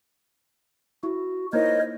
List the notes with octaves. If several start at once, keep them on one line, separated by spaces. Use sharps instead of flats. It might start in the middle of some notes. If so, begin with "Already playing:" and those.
E4 F#4
A#3 D#4 E4 A#4 C5 C#5 D#5